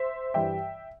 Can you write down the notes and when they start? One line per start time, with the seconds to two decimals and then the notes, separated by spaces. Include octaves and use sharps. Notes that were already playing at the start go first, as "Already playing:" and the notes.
Already playing: C5 E5
0.34 G2 E3 G3 E5 G5